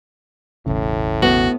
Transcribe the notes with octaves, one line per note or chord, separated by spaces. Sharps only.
E1 A1 A2 C#3
B3 F#4